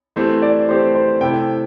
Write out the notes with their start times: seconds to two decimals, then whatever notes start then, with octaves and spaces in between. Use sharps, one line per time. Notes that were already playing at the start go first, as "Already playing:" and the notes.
0.16 E3 A3 C4 G4 C5
0.42 D5
0.68 E3 A3 C4 G4 C5
0.95 C5
1.21 C3 A3 E4 G5